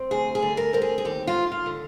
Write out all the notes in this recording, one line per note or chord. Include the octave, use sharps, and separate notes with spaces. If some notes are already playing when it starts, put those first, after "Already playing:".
Already playing: C4
D2 G#4
G#4
D3
A#4
C4 A#4
G#4
G#4
D#2 G4
F4
D#2
F4
D3